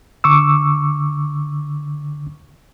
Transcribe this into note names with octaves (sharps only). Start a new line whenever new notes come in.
D3 C#6 D6 E6